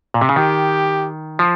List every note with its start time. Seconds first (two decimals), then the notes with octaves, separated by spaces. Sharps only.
0.14 A#2
0.21 C3
0.29 C#3
0.36 D#3 G4
1.39 F3